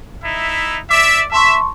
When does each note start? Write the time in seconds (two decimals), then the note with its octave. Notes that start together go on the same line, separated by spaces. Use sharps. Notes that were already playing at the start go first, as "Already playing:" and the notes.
0.23 D#4 E4 E5
0.90 D5 E5 D6
1.32 E5 A5 C6 C#6